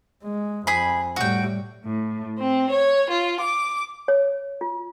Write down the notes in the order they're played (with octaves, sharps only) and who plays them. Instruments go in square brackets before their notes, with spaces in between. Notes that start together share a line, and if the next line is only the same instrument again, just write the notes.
[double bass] G#3
[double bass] F2 [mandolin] G#4 B5
[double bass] A2 G3 [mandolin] F#4 G5
[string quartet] A2
C4
C#5
F4
D6
[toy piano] C#5
F4